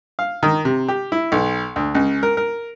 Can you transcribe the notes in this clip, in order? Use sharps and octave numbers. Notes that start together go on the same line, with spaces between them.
F5
D#3
C3
G4
E4
B1
D2
C#2
A#4
A#4